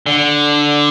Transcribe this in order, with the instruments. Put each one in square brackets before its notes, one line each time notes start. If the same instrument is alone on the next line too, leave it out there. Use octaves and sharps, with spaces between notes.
[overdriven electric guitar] D3